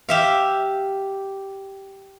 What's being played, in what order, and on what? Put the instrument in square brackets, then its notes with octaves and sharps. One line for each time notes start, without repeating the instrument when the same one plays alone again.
[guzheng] G4 E5 F5